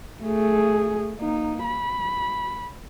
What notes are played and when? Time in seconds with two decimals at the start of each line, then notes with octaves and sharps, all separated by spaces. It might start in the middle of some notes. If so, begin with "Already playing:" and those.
0.23 A3 G#4
1.19 A#3 D#4
1.64 B5